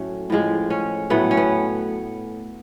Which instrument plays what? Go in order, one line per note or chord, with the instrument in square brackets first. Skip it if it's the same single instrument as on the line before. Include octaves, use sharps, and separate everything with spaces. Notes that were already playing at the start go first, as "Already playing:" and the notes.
Already playing: [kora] A2 F#3 A3 C#4
A2 F3 G#3
C#4
A2 F#3 A3 B3
C#4
B3